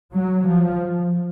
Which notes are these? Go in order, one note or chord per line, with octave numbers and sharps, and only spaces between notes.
F#3
F3